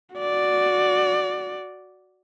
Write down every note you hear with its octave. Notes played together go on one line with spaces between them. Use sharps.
F#4 D5